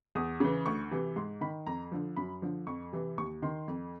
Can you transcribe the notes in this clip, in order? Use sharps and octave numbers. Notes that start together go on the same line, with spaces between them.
E2 D#6
C#3 E3
D2 C#6
C3 E3
G#2 C6
D#3 B5
F2 A#5
D3 F3
F#2 B5
D3 F3
F2 C#6
C3 E3
D#2 C#6
D#3 C6
F2